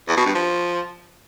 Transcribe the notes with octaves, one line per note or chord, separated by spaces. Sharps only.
E2
B2
G2
F3